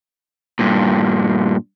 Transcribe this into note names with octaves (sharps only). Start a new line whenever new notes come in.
G2 A#2